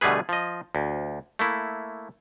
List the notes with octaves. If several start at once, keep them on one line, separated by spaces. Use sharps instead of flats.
B2 D3 G3 A3 G#4 B4
F3 D#5
D2
A3 A#3 E4